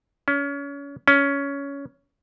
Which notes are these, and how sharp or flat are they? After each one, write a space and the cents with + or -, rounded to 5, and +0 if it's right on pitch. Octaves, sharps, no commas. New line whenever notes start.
C#4 +30
C#4 +15